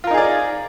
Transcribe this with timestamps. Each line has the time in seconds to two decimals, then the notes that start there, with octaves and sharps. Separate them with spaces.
0.04 F4
0.07 A#4
0.11 D#4
0.14 G#4
0.18 D5